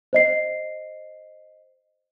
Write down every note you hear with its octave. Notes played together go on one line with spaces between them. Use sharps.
C5 D#5 C7